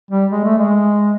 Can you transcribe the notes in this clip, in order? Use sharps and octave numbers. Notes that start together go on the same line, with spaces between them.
G3
G#3
A3
G#3